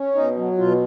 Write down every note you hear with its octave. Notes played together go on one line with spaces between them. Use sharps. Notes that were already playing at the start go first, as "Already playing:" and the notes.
Already playing: C#4
B2 D#4
F#3
B2 F4